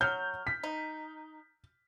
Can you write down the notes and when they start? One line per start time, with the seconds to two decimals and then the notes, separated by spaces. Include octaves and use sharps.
0.01 F#3 F6 G6
0.47 B6
0.63 D#4